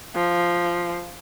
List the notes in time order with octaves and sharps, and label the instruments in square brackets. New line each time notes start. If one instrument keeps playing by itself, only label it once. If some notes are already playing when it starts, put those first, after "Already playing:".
[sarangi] F3